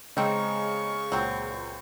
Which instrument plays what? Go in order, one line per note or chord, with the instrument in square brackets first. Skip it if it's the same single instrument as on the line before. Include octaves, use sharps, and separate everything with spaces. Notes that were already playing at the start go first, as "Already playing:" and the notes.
[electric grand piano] C#3 G#3 [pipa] C4 D#4 [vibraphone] G#4 [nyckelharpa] C#6
[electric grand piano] C#2 A#2 [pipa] F#3 C4